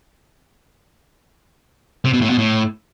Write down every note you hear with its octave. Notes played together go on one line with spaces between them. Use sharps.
C3
B2
A2
B2
A2